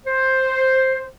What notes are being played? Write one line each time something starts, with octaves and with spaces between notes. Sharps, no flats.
C5